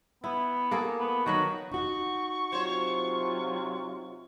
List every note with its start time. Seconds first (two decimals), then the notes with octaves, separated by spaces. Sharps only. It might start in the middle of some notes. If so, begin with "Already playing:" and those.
0.24 B3 E4
0.71 A#3 G#4 A4
1.00 B3
1.26 D#3 F#3 F#4 B4
1.72 D#4 F#4 C#6
2.52 C3 F#3 F4 C5 C#5